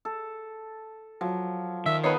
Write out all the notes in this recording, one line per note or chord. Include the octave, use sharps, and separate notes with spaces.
A4
F3 F#3
D#3 E5
B3 D#4 A4 B4 C#5 C7